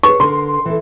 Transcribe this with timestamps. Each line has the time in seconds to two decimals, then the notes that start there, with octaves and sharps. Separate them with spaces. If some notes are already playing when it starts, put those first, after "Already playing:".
0.03 G#4 B4 C#5 C#6
0.20 D3 A#4 C6
0.65 E3 A4